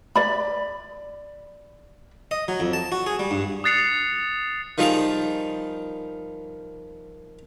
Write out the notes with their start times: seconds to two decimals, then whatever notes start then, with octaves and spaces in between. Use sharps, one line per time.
0.16 D5 B5
2.31 D#5
2.48 F#3
2.60 F2
2.73 A5
2.92 F#4
3.06 G#4
3.19 G3
3.31 G2
3.64 D#6 F#6 A6 C7 C#7 F7
4.78 D#3 F3 G3 G#4 F5